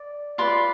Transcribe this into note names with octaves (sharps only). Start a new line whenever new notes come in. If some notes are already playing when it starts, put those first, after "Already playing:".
Already playing: D5
F4 B4 D5 C6